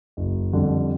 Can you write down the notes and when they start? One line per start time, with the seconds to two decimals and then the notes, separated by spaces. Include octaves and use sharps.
0.17 F#1
0.53 F2 D3 G3